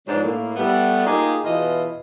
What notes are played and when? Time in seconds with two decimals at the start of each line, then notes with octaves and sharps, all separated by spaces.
0.07 G#2 B2 F3 F#3 G#3 D4
0.22 A2 A#3
0.56 G3 A3 B3
1.07 A#3 D#4 F4 G4 G#4
1.44 E2 B2 E3 E4 F4 D#5